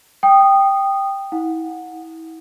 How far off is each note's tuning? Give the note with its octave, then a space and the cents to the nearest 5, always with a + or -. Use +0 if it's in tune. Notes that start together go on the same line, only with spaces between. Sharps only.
G5 +0 D#6 -10
E4 -35 F#5 -25